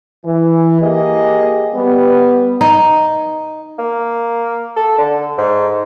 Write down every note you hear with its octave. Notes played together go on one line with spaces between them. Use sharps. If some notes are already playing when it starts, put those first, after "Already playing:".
E3
A#3 G4 G#4 D#5
G3 B3
D#4
A#3
A4
D3
G#2